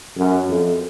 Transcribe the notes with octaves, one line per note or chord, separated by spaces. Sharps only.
F#2
F2